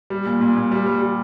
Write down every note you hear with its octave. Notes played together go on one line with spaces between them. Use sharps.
G3
A#2
A#2
A#2
G3
G3
G3